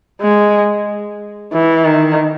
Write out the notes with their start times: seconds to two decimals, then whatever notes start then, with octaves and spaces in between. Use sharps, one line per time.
0.21 G#3
1.53 E3
1.85 D#3